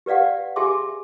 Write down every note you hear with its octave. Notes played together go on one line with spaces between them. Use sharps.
G4 B4 D5 F5 F#5
G4 G#4 E5 G#5 C6 D6